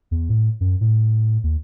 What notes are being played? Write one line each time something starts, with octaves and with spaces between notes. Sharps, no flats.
E2
A2
F#2
A2
D#2